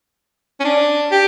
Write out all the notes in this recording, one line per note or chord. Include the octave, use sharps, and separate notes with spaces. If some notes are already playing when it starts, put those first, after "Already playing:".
C#4
D4
G4